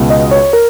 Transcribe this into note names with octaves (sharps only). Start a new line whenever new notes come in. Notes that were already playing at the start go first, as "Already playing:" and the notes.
Already playing: C#2 B2
D#5
C#5
A#4